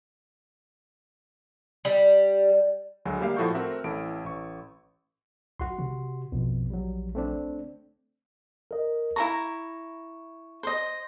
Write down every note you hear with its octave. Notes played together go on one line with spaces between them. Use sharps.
G3
D2 F#3 G#3
G3 A#3 G4 E5 F5
A2 F3 F#4 A4 C#6 G6
A3 C4 F#4 A#4 E5
A1 A3 E4 D7
A1 C#6
B1 F#4 C6
C3
A#1 F2 B2
F#3 G3
A3 C4 D4
A#4 D#5
E4 A4 A#5 C#6
C5 D#5